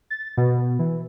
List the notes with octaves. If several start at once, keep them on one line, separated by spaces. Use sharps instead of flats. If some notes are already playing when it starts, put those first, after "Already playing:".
A6
B2
E3